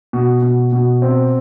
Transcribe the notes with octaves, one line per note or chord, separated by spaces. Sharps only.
B2
B2
B2
C4